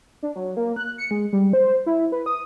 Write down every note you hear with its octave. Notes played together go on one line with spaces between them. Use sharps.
D4
F#3
A#3
F#6
C#7
G#3
G3
C5
E4
B4
D#6